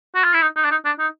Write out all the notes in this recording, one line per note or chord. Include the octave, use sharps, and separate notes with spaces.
F#4
F4
E4
D#4
D#4
D4
D#4
D4
D#4